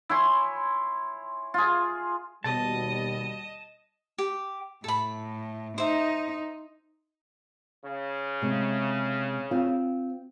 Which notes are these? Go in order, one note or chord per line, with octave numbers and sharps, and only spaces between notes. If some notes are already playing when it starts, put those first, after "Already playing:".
E4 C#5 G#5 C6
F4 G#4
D#2 B2 G3 D#5 A5
G4
A2 A4 B5
D#4 C5 E5
C#3
C3 G#3
C4 F4